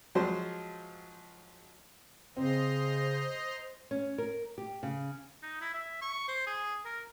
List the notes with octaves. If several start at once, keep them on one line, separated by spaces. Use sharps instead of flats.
F3 F#3 G#3 C5
C#3 C4 C5 D#5 A#5 C6
C#4
A#4
G4
C#3
D#4
E4
E5
C#6
C5
G#4
A#4